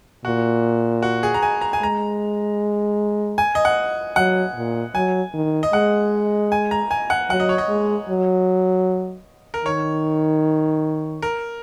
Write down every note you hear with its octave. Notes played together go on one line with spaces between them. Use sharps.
A#2 F#4
F#4
G#4
A#5
G#5
A#5
G#5
G#3 A#5
G#5
D#5
F#5
F#3 F#5
A#2
F#3 G#5
D#3
D#5
G#3 F#5
G#5
A#5
G#5
F#5
F#3 F#5
D#5
C#5
D#5
G#3
F#3
A#4
D#3 C#5
A#4